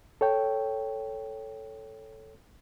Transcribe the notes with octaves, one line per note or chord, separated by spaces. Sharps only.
A4 C#5 G5